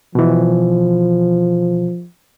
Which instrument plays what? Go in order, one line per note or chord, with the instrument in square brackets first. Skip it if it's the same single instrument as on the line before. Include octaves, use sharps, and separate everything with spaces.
[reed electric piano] B2 E3 [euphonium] F3